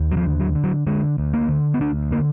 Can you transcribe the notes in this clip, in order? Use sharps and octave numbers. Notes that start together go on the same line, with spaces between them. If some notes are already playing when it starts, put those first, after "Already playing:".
Already playing: D#2
F#3
F3
D3
F#3
D3
F#3
D3 G#3
D2
A#3
D3
B3
D2 D4
D3 A#3